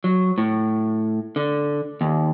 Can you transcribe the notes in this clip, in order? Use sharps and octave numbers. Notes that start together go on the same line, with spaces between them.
F#3
A2
D3
D#2